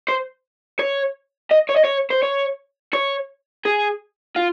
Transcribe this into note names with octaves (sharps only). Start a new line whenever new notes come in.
C5
C#5
D#5
C#5
D#5
C#5
C5
C#5
C#5
G#4
F4